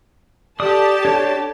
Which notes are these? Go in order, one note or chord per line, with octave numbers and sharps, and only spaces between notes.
G4 A4 D5 A5 D#6
D4 C#5